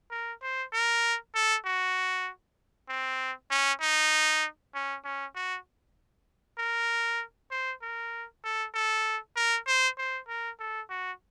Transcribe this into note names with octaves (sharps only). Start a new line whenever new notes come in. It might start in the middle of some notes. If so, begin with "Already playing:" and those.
A#4
C5
A#4
A4
F#4
C4
C#4
D#4
C#4
C#4
F#4
A#4
C5
A#4
A4
A4
A#4
C5
C5
A#4
A4
F#4